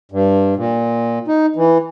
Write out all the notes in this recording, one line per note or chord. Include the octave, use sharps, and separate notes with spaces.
G2
A#2
D#4
E3